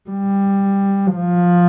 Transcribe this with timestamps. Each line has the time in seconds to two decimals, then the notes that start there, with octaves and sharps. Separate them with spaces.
0.10 G3
1.16 F3